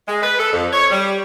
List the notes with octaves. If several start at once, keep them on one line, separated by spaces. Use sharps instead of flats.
G#3
B4
A4
F2
C#5
G3